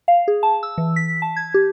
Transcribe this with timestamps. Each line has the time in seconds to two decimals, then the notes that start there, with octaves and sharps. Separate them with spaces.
0.08 F5
0.28 G#4
0.43 A5
0.63 E6
0.78 E3
0.96 B6
1.22 A5
1.36 G#6
1.54 G4